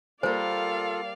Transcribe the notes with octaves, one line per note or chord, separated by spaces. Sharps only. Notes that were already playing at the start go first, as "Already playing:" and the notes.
G3 A#3 F4 A4 C5 D5 F5